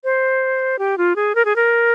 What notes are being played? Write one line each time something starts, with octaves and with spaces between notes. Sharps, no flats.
C5
G4
F4
G#4
A#4
G#4
A#4